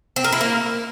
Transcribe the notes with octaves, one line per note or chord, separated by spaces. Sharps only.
C4
A#4
E4
A#3